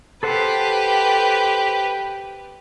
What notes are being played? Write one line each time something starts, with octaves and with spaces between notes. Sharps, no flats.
G4 A4 B4 C5 F#5